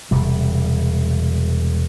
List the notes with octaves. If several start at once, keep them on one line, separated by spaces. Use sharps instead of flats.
E1 C3 G3